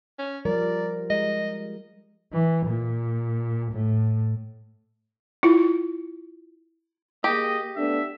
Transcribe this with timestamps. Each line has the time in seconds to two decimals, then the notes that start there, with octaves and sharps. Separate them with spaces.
0.19 C#4
0.45 F3 G3 A#4 D5
1.10 G#3 D#5
2.33 E3
2.66 A#2
3.72 A2
5.43 E4 F4
7.24 A#3 G4 G#4 D#5
7.76 A3 B3 D4 E5